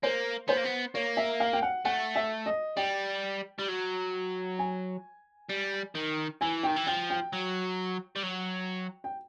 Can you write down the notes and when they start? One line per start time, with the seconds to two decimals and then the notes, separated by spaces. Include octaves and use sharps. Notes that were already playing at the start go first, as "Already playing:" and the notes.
0.03 A#3 C5
0.48 B3 C5
0.57 A#3
0.65 B3
0.94 A#3 C#5
1.17 E5
1.40 F5
1.53 G5
1.62 F#5
1.85 A3 F#5
2.16 E5
2.46 D#5
2.77 G3 G5
3.58 G3
3.68 F#3
4.59 G#5
5.49 G3
5.95 D#3
6.41 E3 G#5
6.63 D#3 G5
6.76 E3
6.87 F3 G5
7.10 G5
7.33 F#3
8.16 G3
8.23 F#3
9.04 G5